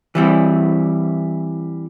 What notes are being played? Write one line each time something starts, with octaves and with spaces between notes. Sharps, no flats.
E3 G3 C4 E4